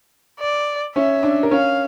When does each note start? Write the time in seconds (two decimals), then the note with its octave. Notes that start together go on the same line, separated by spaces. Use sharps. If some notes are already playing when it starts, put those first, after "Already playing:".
0.40 D5
0.96 C#4 C#5 E5
1.23 D4 D5
1.43 A#4
1.51 C#4 C#5 F5